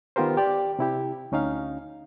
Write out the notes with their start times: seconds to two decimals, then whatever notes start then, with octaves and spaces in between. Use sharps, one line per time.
0.16 D#3 B3 F4 G4 A#4 C5
0.37 G4 D5
0.79 C3 E4 G4
1.32 D2 C#4 D#4 F5